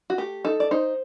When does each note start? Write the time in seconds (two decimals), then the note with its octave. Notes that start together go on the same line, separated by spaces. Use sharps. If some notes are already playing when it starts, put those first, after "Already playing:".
0.10 F#4
0.18 A3 G4
0.45 D#4 A4
0.60 D5
0.71 D#4 C5